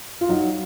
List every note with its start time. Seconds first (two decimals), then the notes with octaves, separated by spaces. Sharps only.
0.21 F4
0.29 F#3 D#4